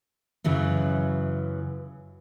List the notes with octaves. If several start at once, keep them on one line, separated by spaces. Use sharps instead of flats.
F#2 C#3 E3 F#3